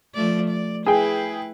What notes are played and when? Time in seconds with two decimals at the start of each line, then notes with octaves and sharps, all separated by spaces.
0.15 F3 A3 D5
0.50 D5
0.86 E4 G#4 B4 G5